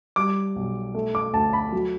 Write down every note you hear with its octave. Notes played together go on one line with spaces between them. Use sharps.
G3 D6
B1
A3
D6
D2 A5
B5
F#3